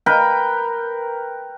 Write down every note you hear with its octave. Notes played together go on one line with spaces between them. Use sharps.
A#4 B4 G5